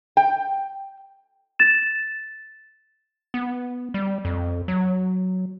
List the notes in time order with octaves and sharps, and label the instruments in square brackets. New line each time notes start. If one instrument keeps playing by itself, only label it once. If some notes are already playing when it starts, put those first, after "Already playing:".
[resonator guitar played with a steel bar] G5
[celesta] A6 E7
[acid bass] B3
G3
F2
F#3